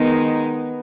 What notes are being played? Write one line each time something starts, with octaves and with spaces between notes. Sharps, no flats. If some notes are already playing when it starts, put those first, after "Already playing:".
Already playing: D#3 G#3 B3 D#4